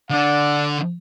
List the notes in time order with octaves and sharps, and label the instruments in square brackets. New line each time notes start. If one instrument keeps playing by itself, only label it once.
[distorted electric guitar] D3 D4 [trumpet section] A4 D5 F#5